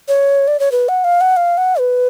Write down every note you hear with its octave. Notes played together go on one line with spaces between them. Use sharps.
C#5
D5
C#5
B4
F#5
F5
F#5
F5
F#5
B4